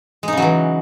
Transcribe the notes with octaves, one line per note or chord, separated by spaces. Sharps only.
C#3 E3 F#3 G#3 D#4